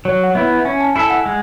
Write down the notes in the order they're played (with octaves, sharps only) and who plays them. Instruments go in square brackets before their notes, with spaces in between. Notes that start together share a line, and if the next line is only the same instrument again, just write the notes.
[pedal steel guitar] F#3 [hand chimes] C#5
[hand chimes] F#5
[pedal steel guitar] B3 E4 [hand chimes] E5
[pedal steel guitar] C#4 [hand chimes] G#5
[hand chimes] A5
[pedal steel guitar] E4 A4 E5 [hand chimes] G#5
[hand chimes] F#5
[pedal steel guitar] G#3